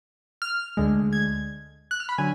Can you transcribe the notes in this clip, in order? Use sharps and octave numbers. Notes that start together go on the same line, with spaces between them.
F6
D2 D3 G#3
G#6
F#6
F6
B5
D3 F#3 G#5